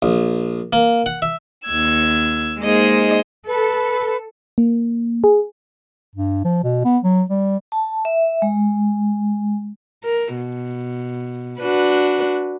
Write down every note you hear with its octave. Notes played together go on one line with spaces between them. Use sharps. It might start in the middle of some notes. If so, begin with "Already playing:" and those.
A#1
A#3
F#5
E5
D#2 E6 G#6
G#3 A#3 D#4 G#4 C5 D#5
A4 B4
A#3
G#4
G2
F3
B2
B3
F#3
G3
A5
E5
G#3
A#4
B2
D4 F#4 B4